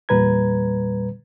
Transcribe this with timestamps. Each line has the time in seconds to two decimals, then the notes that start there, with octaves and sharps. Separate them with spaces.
0.09 E2 A#2 G3 B4 A#5 G#6